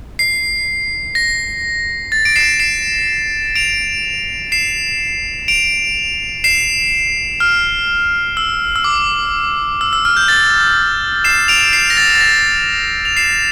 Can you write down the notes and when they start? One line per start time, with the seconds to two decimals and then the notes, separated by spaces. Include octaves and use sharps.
0.19 C7
1.15 A#6
2.12 A6
2.25 D7
2.36 C7 E7
2.60 C7 E7
3.55 D7 F7
4.52 C7 E7
5.48 D7 F7
6.44 C7 E7
7.40 F6
8.37 E6
8.76 E6
8.84 D6
9.81 E6
9.93 E6
10.05 F6
10.17 G6
10.28 A6
11.24 C7 E7
11.48 D7 F7
11.73 C7 E7
11.90 A#6
11.97 A6
12.15 A6
12.21 A#6
13.05 F7
13.17 C7 E7